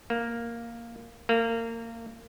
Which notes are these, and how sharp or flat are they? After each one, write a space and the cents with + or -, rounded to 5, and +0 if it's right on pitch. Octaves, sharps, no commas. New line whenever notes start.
A#3 +0
A#3 -25